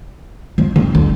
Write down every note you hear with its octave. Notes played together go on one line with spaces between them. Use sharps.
F3
D3
D3